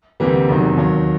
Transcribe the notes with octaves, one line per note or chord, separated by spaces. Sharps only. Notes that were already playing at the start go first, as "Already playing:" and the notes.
D2 C3 E3 G3 A#3
F1 E2 C3 D#3 F#3
D#2 D#3 F#3